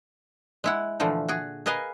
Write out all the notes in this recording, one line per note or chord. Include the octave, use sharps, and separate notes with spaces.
G#3 E4 F#5
A#2 D3 E3 F3 A3
F#4 G#4
G#4 A#4 B4 D#5 F5 G#5